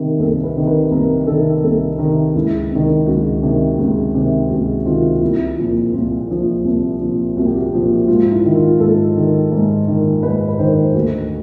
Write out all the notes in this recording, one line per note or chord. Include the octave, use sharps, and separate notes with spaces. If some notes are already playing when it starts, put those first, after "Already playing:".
Already playing: C3 D#3
C2 A4
B4
C3 D#3
B4
C2 A#4
C3 D#3 A4
C2 A4
C3 D#3 A#4
C#2 E4
C3 D#3
C#2 F#4
C3 D#3
C#2
C3 D#3
C#2 F#4
C3 D#3 F4
C2 E4
A#2 F3
C2 F4
A#2 F3
C2
A#2 F3
C2 F#4
G4
F#4
A#2 F3
G#2 F4
E4
D#3
F4
G#2 A4
D#3
G#2
D#3
G#2 B4
B4
D#3 C5
D2 F#4